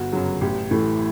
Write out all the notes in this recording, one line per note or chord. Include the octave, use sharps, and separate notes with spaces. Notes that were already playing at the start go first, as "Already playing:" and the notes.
Already playing: G1 F#4
F#2 C#3 F#3
A1 G4
A2 E3 A3